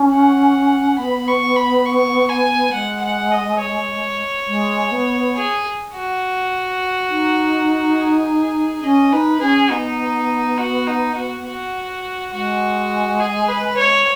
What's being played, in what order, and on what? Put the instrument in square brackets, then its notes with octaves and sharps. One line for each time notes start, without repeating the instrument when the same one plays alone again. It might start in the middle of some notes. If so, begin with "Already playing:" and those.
Already playing: [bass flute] C#4
[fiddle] F#5
[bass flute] B3 [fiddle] B5
[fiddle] C#6
B5
C#6
G#5
[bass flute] G#3 [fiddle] F#5
[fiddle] F#5
D#5
C#5
[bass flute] G#3
B3
[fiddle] G#4
F#4
[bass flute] D#4
[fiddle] G#4
[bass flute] C#4 [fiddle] D#5
[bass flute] D#4 [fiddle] B4
[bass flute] C#4 [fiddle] G#4
[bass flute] B3 [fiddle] D#4
[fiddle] F#4
D#4
F#4
F#4
[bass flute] G#3 [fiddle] F#4
[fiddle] G#4
B4
C#5